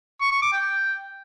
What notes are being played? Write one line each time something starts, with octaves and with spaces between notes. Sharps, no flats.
C#6
C#6
D6
G5